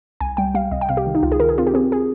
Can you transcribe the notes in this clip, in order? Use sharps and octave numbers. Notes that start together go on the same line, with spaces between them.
C2 G#5
G3 G5
G3 F5
C2 D#5
G5
C3 F5
G4
D#3
D#4
C#2 F4
G#4
D#3 A#4
G#4
C4 F4
G4
C4 G#4
G#4